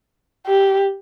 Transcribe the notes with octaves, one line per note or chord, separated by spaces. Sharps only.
G4